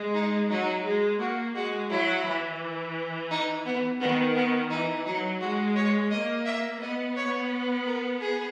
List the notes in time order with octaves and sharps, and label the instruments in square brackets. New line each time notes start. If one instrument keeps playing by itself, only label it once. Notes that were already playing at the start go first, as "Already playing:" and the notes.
Already playing: [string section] G#3
[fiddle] D#4
[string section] F#3 [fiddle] D#4
[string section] G#3
[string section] A#3 [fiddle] F#4
[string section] G#3 [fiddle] F#4
[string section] F#3 [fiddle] E4
[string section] E3
[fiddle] D#4
B3
[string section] D#3 [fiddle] B3
[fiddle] B3
[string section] E3 [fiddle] D#4
[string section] F#3 [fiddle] D#4
[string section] G#3 [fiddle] F#4
[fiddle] C#5
[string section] A#3 [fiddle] D#5
[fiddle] E5
[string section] B3 [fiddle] D#5
[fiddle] C#5
A#4
G#4